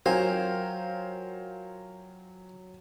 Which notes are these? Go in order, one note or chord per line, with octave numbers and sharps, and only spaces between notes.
F#3 F4 A#4 C5 F5 G5 G#5